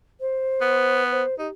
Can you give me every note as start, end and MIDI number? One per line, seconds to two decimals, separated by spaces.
0.20 1.03 72
0.61 1.23 59
1.11 1.37 72
1.39 1.48 63
1.39 1.53 67